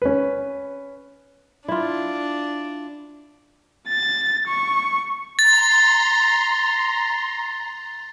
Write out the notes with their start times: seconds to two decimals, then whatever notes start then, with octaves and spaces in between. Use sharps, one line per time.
0.02 C#4 B4
1.68 D4 E4 F4
3.88 A6
4.47 C#6
5.39 A#5 C6 A6